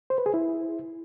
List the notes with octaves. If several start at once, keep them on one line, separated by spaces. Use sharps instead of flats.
C5
B4
G#4
E4